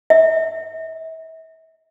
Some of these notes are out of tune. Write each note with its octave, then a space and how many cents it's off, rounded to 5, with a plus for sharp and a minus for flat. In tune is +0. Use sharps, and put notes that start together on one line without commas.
E5 -35